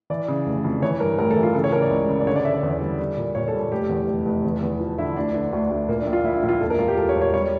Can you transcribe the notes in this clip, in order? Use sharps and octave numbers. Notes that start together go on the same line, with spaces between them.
E3 D5
C#3
F1
F2
E3 C#5
G2 A#4
A1 A#4
A4
E3
F4
C#3 A4
C#5
C#3 A#4
D5
C#2
C#3
D5
D3 C#5
D5
D3 E5
D5
E2
G3
G3
A#2
A#2 C#5
A4
G3
A4
F1 G4
E2
F1
F1
E2
E2
F3
D3 E4
D2 D4
D3
D2
D2
A#2 A#3
D4
A#1
F4
A#1 E4
E4
A#1
F4
E1 A4
A#4
E1 F4
G4
E1 A4
C#5
E1
C#5
G3 C#5